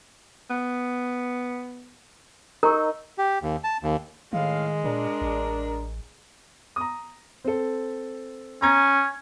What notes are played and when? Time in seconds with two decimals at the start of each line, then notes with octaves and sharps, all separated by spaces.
0.50 B3
2.63 D#4 A#4 A#5 C#6 E6
3.18 G4
3.43 D#2
3.64 A5
3.83 D#2
4.33 A2 D#3 G#3 F5
4.84 A#2 D4 A#4
5.21 A1
6.76 A#5 D#6
7.44 C4 A4
8.62 C#4 A#5 G#6